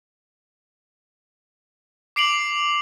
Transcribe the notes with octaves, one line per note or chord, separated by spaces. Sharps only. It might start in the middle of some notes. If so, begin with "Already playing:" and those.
D6 C7 D7 F7 F#7